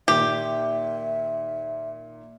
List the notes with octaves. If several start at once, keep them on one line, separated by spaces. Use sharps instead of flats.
A#2 D#3 G4 E5